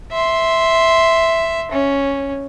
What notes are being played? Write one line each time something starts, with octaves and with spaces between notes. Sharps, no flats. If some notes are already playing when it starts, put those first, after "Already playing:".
E5 C6
C#4